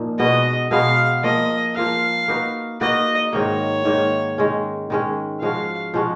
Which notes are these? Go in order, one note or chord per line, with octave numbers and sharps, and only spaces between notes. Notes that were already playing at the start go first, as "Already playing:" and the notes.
Already playing: A#2 F3 A#3 D#4
B2 G#3 B3 F#4 D#5
B2 G#3 B3 F#4 F5
F3 A#3 F4 A#4 D#5
F3 A#3 F4 A#4 F5
A#3 D#4 F#4 B4
A#3 D#4 F#4 B4 D#5
G#2 D#3 A#3 C#5
G#2 D#3 A#3
D#3 G#3 C#4
D#3 G#3 C#4
F3 G#3 C#4 F#4 F5
F3 G#3 C#4 F#4